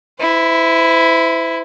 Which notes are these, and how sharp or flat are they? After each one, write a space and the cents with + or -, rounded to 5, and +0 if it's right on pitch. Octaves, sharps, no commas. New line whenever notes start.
E4 +0 C5 -40